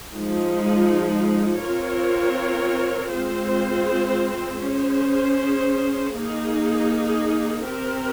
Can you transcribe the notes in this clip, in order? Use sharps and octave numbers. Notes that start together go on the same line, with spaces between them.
F3 G#3 D#4
C4 F4 A#4 C#5
G#3 C4 F4 G#4 C5
C#4 G#4 C5
A#3 D#4 G#4
C4 G4 A#4